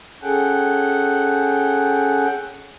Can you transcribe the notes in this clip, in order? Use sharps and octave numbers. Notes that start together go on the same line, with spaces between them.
C#4 G#4 A4 F#5 G5